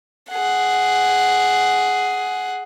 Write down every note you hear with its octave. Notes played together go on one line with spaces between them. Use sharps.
G#4 F#5